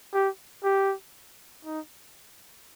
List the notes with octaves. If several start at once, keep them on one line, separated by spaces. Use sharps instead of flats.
G4
G4
D#4